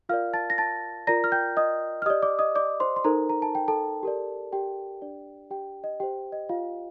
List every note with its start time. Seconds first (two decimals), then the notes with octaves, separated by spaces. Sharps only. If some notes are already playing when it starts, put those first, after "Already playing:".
0.09 F4 A#4 D5 F5 F6
0.33 A5 A6
0.50 A#6
0.58 A5 A6
1.07 F4 A#4 D5 A#5 A#6
1.24 F6
1.32 G5 G6
1.57 D#5 D#6
2.02 F6
2.06 G4 D5 D#5 D#6
2.22 D5 D6
2.39 D#5 D#6
2.55 D5 D6
2.80 C5 C6
2.96 C6
3.04 D#4 A4 A#4 C5 A#5
3.29 A#5
3.42 A5
3.55 G5
3.68 A4 A5
4.03 G4 A#4 D5
4.53 G4 G5
5.01 D4 G4 D5
5.51 G4 G5
5.84 D#5
6.00 G4 C5 G5
6.32 D#5
6.49 F4 F5